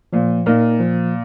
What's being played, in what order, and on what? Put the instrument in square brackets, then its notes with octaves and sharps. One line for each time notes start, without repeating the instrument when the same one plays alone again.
[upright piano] A#2 [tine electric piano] F3
[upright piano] A#2 [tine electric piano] A#3 D#4 A#4
[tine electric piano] F3